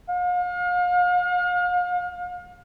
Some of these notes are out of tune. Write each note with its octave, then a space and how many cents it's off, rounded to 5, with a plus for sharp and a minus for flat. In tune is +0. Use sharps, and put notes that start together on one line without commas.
F5 +40